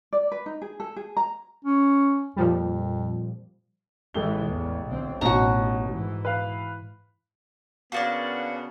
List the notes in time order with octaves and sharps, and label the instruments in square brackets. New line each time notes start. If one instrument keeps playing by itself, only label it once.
[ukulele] D5
B4
D#4
G#4
A4
G#4
A#5
[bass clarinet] C#4
[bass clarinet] F2 [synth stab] A#2 F3 G3
[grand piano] A1 A3 G7 [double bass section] E3 G#3
[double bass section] E2
B1 D3 C4
[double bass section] A1 [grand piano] B2 C#4 D#4 [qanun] F#4 A#5
[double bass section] G#2 E3
[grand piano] B4 F5
[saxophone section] C#3 B3 F#4 [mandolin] A#3 D4 D5